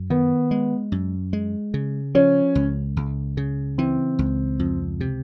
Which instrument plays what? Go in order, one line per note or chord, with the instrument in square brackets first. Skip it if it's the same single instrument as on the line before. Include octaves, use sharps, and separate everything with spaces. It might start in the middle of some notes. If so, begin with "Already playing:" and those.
Already playing: [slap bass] F#2
[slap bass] D#3 [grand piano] B3
[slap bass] G#3
F#2
G#3
C#3
[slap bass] F3 [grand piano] C#4
[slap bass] C#2
C#2
C#3
[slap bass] E3 [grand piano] C4
[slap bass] C#2
F2
C3